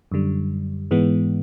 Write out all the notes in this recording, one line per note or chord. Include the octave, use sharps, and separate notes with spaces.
F#2 D3 G3
G#2 E3 G#3 B3